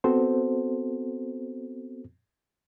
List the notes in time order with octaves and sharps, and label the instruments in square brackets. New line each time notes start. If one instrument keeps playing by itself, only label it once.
[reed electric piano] B3 C4 F#4 A4 C5